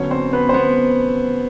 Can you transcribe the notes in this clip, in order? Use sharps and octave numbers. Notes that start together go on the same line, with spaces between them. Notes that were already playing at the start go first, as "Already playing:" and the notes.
Already playing: D3 F#3 B3 C#4 C#5
C4 C5
B3 B4
C5
B3 B4